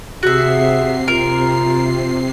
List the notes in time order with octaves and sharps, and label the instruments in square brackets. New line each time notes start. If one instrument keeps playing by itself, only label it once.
[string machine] C3 C7 [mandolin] F#4 E5 [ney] G#4
[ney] F4 [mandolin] A#4